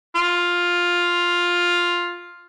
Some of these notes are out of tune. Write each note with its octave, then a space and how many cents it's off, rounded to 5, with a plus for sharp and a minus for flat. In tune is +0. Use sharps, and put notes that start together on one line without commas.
F4 +5